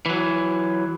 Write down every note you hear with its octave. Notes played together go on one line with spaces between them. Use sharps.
E3 F#3